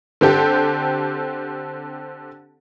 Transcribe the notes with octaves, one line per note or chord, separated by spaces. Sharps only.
D3 C4 G4 A4